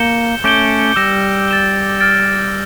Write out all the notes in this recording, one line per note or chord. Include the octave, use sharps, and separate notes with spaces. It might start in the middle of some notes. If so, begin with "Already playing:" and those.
Already playing: A#3 G6 C#7 E7 G7
A3 C#4 D6 G6 D7 G7
G3 E6 A#6 E7 G7
A6 E7 G7
F6 A6 D7